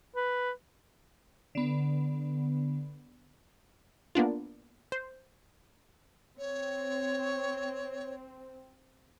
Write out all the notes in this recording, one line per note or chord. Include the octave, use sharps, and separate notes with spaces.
B4
D3 B3
A#3 B3 D4 F4
C5
C4 C#5